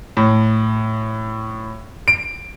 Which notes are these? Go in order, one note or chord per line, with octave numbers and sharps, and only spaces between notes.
A2
D7